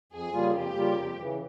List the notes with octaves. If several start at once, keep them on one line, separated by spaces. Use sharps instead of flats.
F2 G#4
C#3 G3 A#3 F4
F2 G4
C#3 G3 A#3 F4
F2
C#3 E3